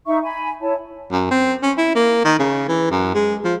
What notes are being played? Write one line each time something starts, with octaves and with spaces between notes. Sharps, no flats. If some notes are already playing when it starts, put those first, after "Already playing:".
D#4 E5 C#6
G#5 B5
E4 C#5 A5
F#2
C4
C#4
E4
A#3
D#3
C#3
E3
F#2
G#3
F3